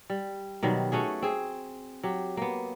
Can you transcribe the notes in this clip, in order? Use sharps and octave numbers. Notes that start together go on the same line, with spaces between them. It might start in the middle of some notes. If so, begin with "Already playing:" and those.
G3
B2 D#3 F#3 G3
A3 C#4 F#4 G#4
C4 G#4
F#3 G4
A#3 B3